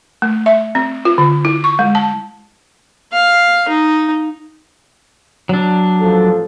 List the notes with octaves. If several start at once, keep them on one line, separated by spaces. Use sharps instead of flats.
A3
E5
C4
F4
D3
E4
C#6
G#3
A5
F5
D#4
F#3 D4
A1 F3 A4